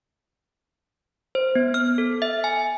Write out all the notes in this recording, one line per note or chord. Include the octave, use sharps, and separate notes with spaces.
C5
B3
F6
A4
E5
G#5